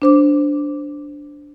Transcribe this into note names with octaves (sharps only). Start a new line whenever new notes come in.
D4 C5 D6